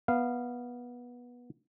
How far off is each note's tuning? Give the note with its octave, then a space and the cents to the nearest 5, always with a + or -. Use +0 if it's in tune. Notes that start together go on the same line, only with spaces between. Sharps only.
B3 -20 F5 -10